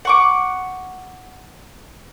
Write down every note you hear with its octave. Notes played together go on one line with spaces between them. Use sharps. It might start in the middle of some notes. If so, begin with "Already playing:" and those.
F#5 C#6 D6